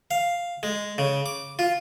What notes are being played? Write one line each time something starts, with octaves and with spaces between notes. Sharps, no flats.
F5
G#3
C#3
D6
F4